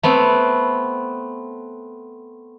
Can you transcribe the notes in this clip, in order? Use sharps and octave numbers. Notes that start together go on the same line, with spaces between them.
A3 B3 C4